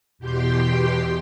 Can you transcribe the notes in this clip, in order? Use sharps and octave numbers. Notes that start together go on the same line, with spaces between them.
E2 B2 G4 G5 C6